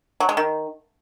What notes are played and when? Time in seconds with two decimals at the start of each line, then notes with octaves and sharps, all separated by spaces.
0.20 F#3
0.29 G#3
0.37 D#3